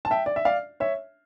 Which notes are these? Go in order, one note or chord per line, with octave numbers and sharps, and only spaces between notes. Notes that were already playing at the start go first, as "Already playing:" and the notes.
A5
E5 G5
D5
E5
D5 F5
C#5 E5